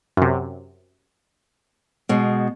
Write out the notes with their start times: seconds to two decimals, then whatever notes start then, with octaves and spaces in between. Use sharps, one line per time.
0.17 F#2 C3
2.09 B2 G#3